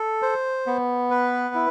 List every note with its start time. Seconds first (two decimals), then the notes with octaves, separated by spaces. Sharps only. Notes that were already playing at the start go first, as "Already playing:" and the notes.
Already playing: A4
0.22 C5
0.67 B3
1.11 B4
1.55 E4